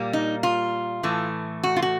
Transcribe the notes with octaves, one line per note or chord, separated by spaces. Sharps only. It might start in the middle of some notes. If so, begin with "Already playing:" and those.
Already playing: A#2 G3 A#3
D#4
F4
A2 E3 A3
F#4
F4
F#4